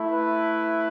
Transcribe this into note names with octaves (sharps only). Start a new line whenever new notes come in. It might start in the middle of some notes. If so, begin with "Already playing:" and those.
Already playing: A3 E4
B4